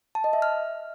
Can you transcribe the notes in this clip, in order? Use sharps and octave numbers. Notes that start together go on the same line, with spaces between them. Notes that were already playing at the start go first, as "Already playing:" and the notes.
A5
D#5
E5
F6